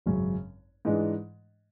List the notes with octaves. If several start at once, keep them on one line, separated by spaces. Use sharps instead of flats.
G#1 F#2 C#3 F#3 C#4
G#2 E3 G#3 D4